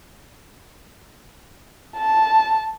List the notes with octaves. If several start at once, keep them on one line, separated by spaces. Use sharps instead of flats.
A5